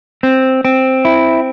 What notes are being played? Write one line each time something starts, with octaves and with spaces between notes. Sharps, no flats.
C4
C4
E4